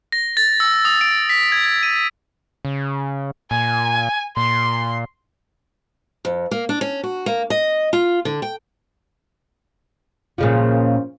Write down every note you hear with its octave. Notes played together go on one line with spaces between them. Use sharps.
A#6
A6
E6
D#6
D7
B6
G#6
G#6
D#7
C#3
A#2 G#5
A#2 C6
F2
A#3
D4
C#4
F#4
A#3
D#5
F4
D3
G5
A#2 C#3 F3